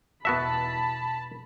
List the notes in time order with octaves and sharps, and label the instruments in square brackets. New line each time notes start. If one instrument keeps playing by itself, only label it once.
[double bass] E2 B2 [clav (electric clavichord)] B3 F#4 E5 [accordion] A5 [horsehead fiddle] B5